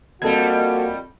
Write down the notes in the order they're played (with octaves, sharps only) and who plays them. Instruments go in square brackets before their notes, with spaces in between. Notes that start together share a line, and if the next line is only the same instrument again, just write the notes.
[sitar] F2 G3 [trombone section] A#3 F#4 [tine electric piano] A4 G#6